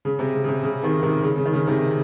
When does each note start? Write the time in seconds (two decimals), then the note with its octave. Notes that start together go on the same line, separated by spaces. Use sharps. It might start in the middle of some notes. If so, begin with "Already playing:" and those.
0.05 C#3
0.19 C3
0.34 C#3
0.44 C#3
0.48 C3
0.63 C#3
0.83 C3 D#3
1.03 C3 D#3
1.23 C#3
1.37 C#3
1.46 D#3
1.53 C#3
1.67 C3 D#3